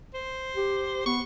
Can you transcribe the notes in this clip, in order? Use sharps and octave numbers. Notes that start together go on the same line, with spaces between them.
C5
G4
B3 C#6